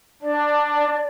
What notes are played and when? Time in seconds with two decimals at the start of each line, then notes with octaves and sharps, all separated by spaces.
0.22 D4 D5